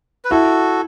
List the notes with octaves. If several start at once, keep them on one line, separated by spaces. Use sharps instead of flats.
B4
E4 F#4 A4